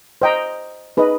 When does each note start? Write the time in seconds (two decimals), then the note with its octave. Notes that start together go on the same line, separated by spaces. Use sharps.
0.22 C5 D#5 G5 A#5
0.97 D#4 G#4 B4 D#5